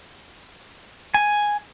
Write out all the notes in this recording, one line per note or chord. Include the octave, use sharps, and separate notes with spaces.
G#5